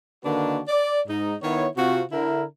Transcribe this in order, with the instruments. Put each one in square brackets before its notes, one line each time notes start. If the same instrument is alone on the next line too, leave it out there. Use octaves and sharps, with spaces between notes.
[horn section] D3 D#3 A#3 D4 F#4 B4
D5
G#2 D#4
D#3 B3 E4 C#5
C3 C4 F4 F#4
D3 E4 A#4